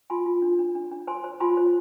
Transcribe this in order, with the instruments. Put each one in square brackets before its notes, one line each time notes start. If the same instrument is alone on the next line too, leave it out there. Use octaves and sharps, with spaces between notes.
[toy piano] F4 G#5 C6
F4
D4
D4
D4
D4
C5 G#5 C6
C5
F4 G#5 C6
C5